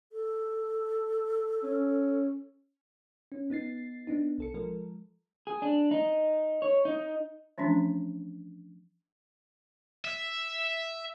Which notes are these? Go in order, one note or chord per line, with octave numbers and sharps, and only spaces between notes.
A4
C#4
C#4
B3 D#4 A6 C7
B3 D4 D#4
B1 A4 C#7
F3 G#3 A4 A#4
G#4
D4
D#4
C#5
D#4
E3 F3 A3 C#4 D4
E5